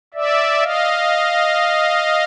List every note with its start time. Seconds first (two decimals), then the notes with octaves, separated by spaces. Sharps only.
0.14 D5 E5
0.61 D#5 F5